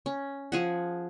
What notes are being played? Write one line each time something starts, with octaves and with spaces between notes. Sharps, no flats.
C#4
F3 G#4 F#5